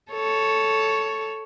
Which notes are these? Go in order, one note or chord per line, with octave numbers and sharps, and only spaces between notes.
A4 C#5